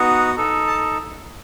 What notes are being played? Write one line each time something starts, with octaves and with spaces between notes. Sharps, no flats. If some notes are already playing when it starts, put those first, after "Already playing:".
Already playing: B3 D#4 F#4
D#4 A4
A5